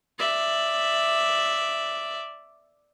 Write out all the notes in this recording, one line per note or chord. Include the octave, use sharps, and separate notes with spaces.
D5 E5